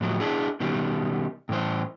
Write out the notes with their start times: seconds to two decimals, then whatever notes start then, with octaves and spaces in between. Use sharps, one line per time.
0.01 A2 F3 F#3
0.20 D4 E4 G#4
0.60 B2 D#3 G3
1.49 A2 E3 C5